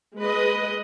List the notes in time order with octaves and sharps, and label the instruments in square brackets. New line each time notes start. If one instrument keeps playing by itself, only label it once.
[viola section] G#3 B4 D#5